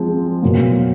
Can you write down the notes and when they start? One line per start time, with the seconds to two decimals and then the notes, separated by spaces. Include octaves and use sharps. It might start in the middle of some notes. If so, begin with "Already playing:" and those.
Already playing: F3 G#3 C4
0.42 B2 F#3 A#3